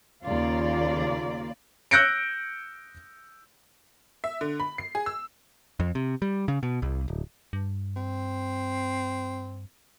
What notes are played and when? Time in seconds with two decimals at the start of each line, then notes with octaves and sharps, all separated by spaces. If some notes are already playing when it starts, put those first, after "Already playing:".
0.24 D#2 C#3 A#3 F4 D5
1.91 E6 F#6 G6 A#6 C#7 D7
4.24 E5
4.41 D3
4.60 B5
4.78 C7
4.95 G#4
5.06 E6
5.80 F2
5.95 C3
6.22 G3
6.48 C#3
6.63 B2
6.82 C2
7.08 D1
7.53 G2
7.96 C4